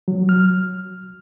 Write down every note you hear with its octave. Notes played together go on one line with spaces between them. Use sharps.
F#3
F6